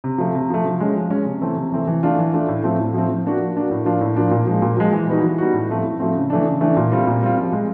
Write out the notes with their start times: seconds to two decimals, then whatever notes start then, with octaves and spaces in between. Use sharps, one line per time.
0.04 C3
0.18 F3 A3
0.35 C3
0.50 F3 A3
0.65 F3
0.80 G#3 C#4
0.96 F3
1.10 G#3 C#4
1.25 C3
1.41 E3 A3 C4
1.56 C3
1.72 E3 A3 C4
1.87 E3
2.03 A3 D4 F4
2.18 E3
2.33 A3 D4 F4
2.49 A2
2.64 F3 A3 C4
2.79 A2
2.94 F3 A3 C4
3.09 F3
3.25 A#3 D4 F#4
3.39 F3
3.56 A#3 D4 F#4
3.71 A2
3.85 F3 A#3 D4 F4
4.01 A2
4.16 F3 A#3 D4 F4
4.31 A#2
4.47 F3 G#3
4.62 A#2
4.77 F3 G#3
4.92 E3
5.08 G3 B3 D#4 F#4
5.23 E3
5.38 G3 B3 D#4 F#4
5.54 A2
5.69 F3 A3 C4
5.84 A2
6.00 F3 A3 C4
6.15 C#3
6.30 E3 A3 D4
6.45 C#3
6.61 E3 A3 D4
6.77 A#2
6.92 G3 C4 F4
7.07 A#2
7.23 G3 C4 F4
7.38 F3
7.53 G#3 C4